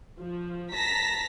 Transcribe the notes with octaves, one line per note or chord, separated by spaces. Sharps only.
F3
A5 A#5 A#6 B6